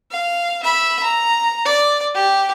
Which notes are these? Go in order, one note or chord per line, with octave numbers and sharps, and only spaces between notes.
F5
E5 B5
A#5
D5
G4